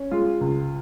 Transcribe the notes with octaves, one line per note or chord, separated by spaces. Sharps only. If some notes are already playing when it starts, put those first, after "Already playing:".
Already playing: C#4
G#3 F4
C#2